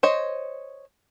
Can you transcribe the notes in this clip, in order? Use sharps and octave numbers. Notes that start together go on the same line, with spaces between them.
C5 C#5 D#5